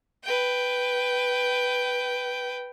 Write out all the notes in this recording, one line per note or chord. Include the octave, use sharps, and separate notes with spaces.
B4 G5